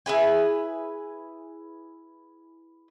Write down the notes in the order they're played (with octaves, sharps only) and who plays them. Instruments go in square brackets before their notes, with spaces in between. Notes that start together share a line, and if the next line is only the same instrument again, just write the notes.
[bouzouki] E4 G#4 B4 G#5